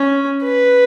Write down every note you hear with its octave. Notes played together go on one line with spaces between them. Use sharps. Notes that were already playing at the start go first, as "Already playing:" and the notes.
Already playing: C#4
B4